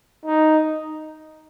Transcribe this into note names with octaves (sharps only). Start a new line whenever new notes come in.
D#4